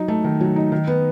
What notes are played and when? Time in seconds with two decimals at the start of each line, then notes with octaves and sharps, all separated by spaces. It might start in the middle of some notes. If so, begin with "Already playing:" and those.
Already playing: F#3 D#4
0.08 A3
0.24 D#3
0.41 F#3
0.56 D#4
0.72 D#3
0.87 B3